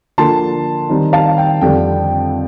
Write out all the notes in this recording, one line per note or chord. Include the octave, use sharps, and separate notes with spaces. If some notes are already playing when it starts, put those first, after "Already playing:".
D3 F3 A#3 D4 A5 C6
D#3 G3 C4 D#4
F5 A5
G5
F2 D3 G3 D4 G5